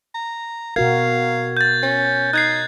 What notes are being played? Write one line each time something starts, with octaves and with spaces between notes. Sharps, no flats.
A#5
B2 F#4 A#4 F5 G#6
G6 A6
C#4
D#4 F#6 G#6 C7